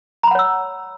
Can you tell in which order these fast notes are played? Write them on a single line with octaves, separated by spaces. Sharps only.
A#5 B5 F#5 C#5 E6